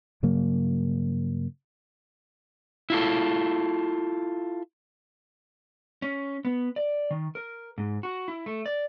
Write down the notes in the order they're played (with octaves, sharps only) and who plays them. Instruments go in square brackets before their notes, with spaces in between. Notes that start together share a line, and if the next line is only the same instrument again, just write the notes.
[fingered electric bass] G2 C#3 F#3 A#3
[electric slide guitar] E4 F4 A4
C#4
B3
D5
D#3
A#4
G#2
F#4
E4
A3
D5